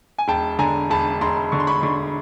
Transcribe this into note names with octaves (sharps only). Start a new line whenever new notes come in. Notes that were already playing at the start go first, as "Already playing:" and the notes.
G#5
E1 G5 A5
D3 G#5 A#5
E1 A5 B5
E1 A#5 C6
D3 C#6
C6
B5 C#6
D3 B5 C#6